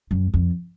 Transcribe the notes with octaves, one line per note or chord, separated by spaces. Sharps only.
F#2
F2